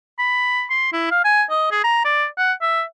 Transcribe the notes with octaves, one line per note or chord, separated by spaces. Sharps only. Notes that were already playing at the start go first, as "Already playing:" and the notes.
B5
C6
E4
F5
G#5
D#5
G#4
A#5
D5
F#5
E5